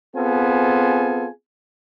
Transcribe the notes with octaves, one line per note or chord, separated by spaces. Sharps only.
B3 C4 F4 G#4 A4 G#5